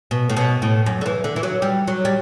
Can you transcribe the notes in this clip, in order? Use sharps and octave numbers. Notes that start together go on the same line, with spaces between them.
B2
A2
B2
A2
F#2
D3
E3
D3
E3
F#3
G3
F#3
G3